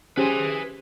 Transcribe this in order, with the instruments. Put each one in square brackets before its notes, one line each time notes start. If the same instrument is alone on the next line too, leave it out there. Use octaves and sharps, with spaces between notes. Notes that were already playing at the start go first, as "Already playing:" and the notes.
[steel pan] C#4 G4 C5 [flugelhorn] G#4 [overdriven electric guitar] B4 G#5